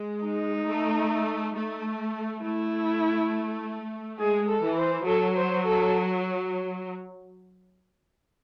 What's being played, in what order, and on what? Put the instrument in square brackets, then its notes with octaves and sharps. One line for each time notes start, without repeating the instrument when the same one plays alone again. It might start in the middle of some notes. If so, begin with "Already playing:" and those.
Already playing: [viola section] G#3
[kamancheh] D#4
[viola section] A3
A3
[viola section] A3 [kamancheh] E4
[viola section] G#3 [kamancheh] G#4
[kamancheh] A4
[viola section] E3
[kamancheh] C5
[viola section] F#3 [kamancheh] A4
[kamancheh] C5
A4